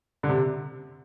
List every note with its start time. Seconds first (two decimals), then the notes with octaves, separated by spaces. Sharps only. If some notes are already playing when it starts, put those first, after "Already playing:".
0.23 D3
0.29 C3